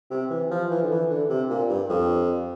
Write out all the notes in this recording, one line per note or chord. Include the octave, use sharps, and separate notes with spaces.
C3
E3
F3
E3
D3
E3
D3
C3
A#2
G2
F2